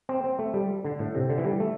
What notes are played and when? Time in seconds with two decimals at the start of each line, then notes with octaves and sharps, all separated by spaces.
0.09 C4
0.24 C4
0.39 A3
0.54 G3
0.84 D3
0.99 A2
1.15 C3
1.30 D3
1.38 E3
1.44 G3
1.60 A3